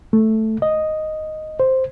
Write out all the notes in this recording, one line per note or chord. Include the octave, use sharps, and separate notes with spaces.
A3
D#5
C5